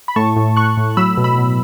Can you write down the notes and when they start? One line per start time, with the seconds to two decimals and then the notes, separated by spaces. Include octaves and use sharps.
0.08 B5
0.16 A2 A5 C#6
0.36 A2
0.56 A2 C#6 F#6
0.77 A2
0.97 F#3 B5 E6
1.17 B2
1.24 B5 E6
1.38 B2